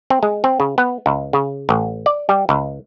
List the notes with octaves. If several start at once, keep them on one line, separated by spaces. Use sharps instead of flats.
C4
G#3
C4
C#3
B3
C#2
C#3
A1
D5
G3
C#2